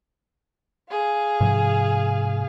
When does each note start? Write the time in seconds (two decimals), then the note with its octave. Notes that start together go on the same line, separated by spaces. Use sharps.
0.90 G#4 F5
1.41 G#2 C3 F3